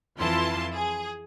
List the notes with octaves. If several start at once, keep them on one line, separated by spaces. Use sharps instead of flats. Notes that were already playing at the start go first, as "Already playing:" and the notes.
F2 E3 E4 F4 A5 C6
G#4